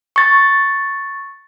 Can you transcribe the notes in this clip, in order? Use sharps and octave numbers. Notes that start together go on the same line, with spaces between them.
C#6 A6